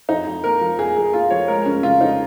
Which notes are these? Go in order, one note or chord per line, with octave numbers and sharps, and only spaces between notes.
F2 D#4
F2
A#3 A#4
F3
F2 G#4
F2 G#4
A#3 F4
F3 C#5
G#3 A#4
F1 C#4
C#3 F4
F2 D#4